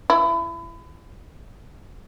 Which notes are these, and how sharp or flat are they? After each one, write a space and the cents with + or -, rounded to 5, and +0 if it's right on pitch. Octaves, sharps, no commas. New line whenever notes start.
E4 +30